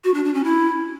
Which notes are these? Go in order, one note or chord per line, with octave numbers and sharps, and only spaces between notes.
F#4
D4
D4
C#4
E4